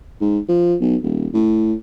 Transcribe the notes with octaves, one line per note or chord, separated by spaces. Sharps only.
G#2
F3
B1
D#1
A2